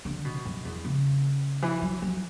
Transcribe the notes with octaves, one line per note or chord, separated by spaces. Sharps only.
D3
B2
F#2
E2
C#3
E3
F#3
F#3